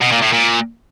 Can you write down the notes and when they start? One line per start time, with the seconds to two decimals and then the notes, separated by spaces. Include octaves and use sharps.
0.02 B2
0.12 A#2
0.22 A2
0.33 A#2